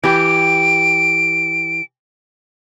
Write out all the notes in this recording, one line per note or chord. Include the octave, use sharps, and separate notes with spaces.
E3 G4 D7